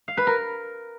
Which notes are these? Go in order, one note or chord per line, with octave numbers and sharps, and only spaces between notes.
F5
B4
A#4